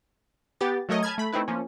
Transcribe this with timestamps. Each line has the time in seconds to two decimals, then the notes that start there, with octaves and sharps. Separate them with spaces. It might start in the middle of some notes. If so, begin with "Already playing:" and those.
0.61 B3 G4 A6
0.89 F#3 A3 A#4 C#5 D#5
1.03 G#5 A5 B5 F6 G#6
1.18 A3 B5
1.32 A3 C4 D#4 E4 B4
1.48 F3 A#3 C#4